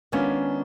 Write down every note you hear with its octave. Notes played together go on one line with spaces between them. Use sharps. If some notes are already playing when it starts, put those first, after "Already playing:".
D#3 G#3 B3 C#4 D4 F4